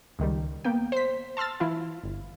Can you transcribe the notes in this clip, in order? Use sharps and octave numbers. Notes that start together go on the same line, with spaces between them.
C#2 D#3 G3
A#3 B3 G5
C5 B6
A5 C6 E6 F6 A6
E3 E4 F4
G1